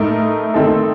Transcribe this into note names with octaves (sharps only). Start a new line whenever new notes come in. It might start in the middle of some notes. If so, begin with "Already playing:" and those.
Already playing: A2 A3 D#4 A#4
D#3 A3 C4 D#4 A4